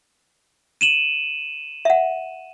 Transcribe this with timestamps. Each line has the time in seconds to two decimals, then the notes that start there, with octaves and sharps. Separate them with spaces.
0.81 D#7 E7 F#7
1.85 E5 F#5